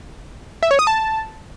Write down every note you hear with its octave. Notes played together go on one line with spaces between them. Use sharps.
E5
C#5
D#6
A5